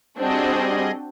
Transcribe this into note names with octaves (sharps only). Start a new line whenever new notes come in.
G3 C4 D4 F#4 G#4 D#5